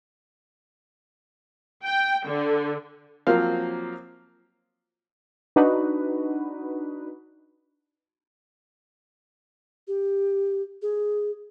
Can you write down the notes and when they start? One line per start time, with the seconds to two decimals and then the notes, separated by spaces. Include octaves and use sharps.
1.84 G5
2.27 D3
3.27 F3 F#3 A#3 C4 F5
5.56 D4 D#4 F#4 B4
9.88 G4
10.82 G#4